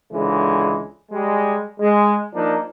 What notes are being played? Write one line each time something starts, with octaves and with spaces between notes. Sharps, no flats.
C#2 D3 E3 G#3
G3 G#3
G#3
F3 A#3 D4 D#4